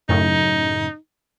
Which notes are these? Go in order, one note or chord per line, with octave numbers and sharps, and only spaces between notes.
F#2 A2 C#3 D#4